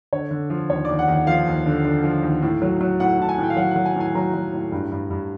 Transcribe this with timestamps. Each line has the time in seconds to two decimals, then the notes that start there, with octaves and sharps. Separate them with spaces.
0.13 D3 C#5
0.31 D3
0.50 F3
0.69 D#2 C#5
0.85 D#2 D5
0.99 F#5
1.08 D#2
1.13 F#5
1.27 F3 F5
1.47 D#2
1.66 D3
1.85 D3
2.04 F3
2.22 D#2
2.42 A2
2.62 F#3
2.81 F#3
3.00 A2 F#5
3.19 A2 A5
3.29 G#5
3.38 A2 G5
3.50 F5
3.57 F#3 F#5
3.71 F#3 F#5
3.86 G#5
3.96 A2 G#5
4.15 F#3 A#5
4.34 F#3
4.53 A2
4.72 G2
4.91 G2
5.10 G2